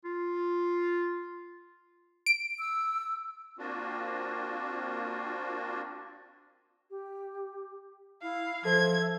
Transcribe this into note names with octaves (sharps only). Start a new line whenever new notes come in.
F4
D7
E6
A#3 C4 D4 F4 F#4
G4
E4 F5
F3 A4 E5 G#6